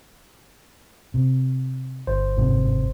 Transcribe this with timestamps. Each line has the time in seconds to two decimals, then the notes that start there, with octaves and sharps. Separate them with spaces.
1.14 C3
2.07 G1 C5
2.37 F2 G#2 C3